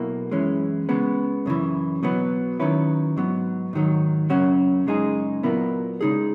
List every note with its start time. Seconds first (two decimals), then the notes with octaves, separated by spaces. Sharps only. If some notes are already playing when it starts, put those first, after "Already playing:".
Already playing: B1 B2 A#3 E4
0.31 F#2 E3 G#3 C#4
0.89 C#3 G#3 B3
1.46 F#2 C#3 E3
2.03 B2 F#3 B3
2.60 D#3 F#3 C#4 E4 B4
3.16 G#2 F#3 B3
3.73 G#2 D#3 F#3
4.30 F#2 C#3 F#3 C#4 F#4
4.86 F#2 C#3 G#3 D#4 G#4
5.43 A#2 F#3 B3 E4 A#4
6.01 C#3 G#3 D#4 G#4